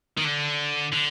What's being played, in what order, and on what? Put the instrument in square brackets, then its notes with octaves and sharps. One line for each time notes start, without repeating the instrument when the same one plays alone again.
[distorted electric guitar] D#3
D3
D3